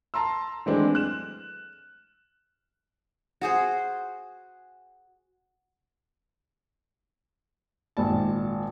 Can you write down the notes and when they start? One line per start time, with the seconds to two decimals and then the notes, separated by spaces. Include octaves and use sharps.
0.14 A5 A#5 C6 E6
0.66 E3 F#3 G#3 A3 C4 D4
0.95 F#6 E7
3.41 F#4 G#4 C5
7.97 G#1 A#2 A5